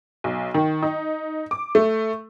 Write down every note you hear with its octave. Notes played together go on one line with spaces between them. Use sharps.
B1
D#3
D#4
D6
A3